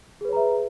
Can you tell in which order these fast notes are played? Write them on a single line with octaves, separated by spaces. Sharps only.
G#4 B4 C#5 A#5 E5